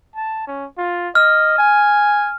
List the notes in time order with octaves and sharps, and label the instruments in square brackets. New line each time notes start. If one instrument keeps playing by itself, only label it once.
[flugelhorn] A5
C#4
F4
[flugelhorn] D#5 [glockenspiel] F6
[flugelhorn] G#5